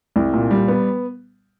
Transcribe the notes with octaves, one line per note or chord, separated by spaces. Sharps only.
C2
A#2
G3
B3